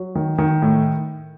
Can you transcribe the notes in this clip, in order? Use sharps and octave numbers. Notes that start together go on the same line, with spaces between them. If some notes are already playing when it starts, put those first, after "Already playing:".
Already playing: F#3
D#3
D#3
A2